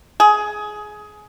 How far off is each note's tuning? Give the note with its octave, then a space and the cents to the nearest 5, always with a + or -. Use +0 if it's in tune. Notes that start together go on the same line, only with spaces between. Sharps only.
G#4 +15